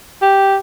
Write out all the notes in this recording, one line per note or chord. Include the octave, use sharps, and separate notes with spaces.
G4